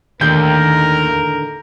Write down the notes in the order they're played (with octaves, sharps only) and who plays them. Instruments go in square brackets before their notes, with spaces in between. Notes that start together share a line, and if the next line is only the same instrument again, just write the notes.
[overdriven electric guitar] D#2 [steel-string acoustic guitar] A2 D3 D#3 [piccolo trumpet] A#4 [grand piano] G6